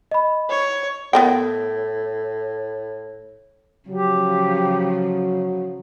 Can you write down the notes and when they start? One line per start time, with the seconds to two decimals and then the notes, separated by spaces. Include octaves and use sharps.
0.11 D#5 B5
0.50 C#5
1.13 A2 B3 A#4 G5
3.89 C#3 F3 F#3 G4